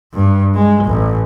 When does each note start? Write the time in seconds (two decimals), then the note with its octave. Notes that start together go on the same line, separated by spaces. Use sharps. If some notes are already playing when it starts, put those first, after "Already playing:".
0.14 G2
0.54 G#3
0.84 A1